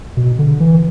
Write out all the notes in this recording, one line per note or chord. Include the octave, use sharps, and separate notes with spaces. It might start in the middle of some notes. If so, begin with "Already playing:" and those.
B2
D3
E3